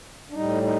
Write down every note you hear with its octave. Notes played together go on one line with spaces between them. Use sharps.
D4
A2 G3 D#4
D#4